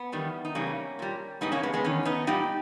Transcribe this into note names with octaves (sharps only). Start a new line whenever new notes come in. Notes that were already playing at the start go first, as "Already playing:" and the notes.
Already playing: B3
E2 D#3 G3
D#4
E2 C#3 G3 A#3 C#4
A#2 G3
G#2 G3 B3 D#4
A#3 C#4
G#3 B3
G#3 B3
E2 D#3 C#4
B3 D#4
A#2 G3 D#4 G4